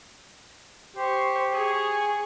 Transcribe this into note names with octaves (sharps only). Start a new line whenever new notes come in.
G4 C5 C#6
G#4 C#6